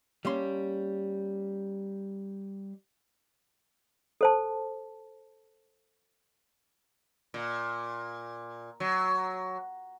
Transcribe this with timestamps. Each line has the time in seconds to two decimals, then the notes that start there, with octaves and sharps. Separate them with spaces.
0.25 G3 A#3 C#4 C6
4.21 A4 C5 A5
7.34 A#2
8.80 F#3